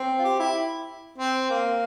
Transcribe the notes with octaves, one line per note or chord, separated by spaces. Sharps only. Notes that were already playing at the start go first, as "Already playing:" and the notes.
Already playing: C4
F4
G4
E4
C4
A#3